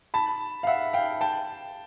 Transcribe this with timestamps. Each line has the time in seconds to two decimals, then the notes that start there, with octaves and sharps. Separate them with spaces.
0.14 A5 B5
0.63 F5
0.67 E5 F#5
0.93 F5 G5
1.21 G5 A5